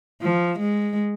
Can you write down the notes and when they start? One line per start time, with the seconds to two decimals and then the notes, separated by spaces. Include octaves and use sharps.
0.21 F3
0.59 G#3